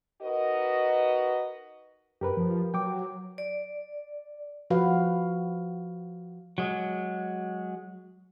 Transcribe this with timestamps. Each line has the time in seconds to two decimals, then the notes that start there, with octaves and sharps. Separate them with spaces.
0.22 D#4 F#4 A#4 B4 D#5
2.21 F#2 G4 A#4 B4
2.37 F3
2.74 F#3 G5 D6
3.38 D5
4.70 F3 F#4 B4 F5
6.58 F#3 G#3